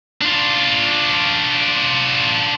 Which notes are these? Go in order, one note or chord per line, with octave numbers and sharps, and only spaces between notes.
D4 F4